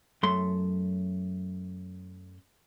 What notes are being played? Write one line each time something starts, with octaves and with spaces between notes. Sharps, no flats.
F#2 A3 C6